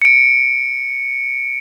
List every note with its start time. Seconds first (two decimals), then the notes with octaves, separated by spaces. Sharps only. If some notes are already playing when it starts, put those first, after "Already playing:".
0.02 C#7 D7